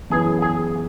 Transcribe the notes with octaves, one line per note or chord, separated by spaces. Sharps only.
F#2 E3 B3 G#4
G#4